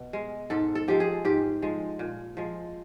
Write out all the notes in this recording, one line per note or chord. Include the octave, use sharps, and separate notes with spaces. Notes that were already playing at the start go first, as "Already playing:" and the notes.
Already playing: B2
G#3
G#2 A4
A4
F3 G#3 G4
G#4
G#2 G4
F3 G#3
A#2
F3 G#3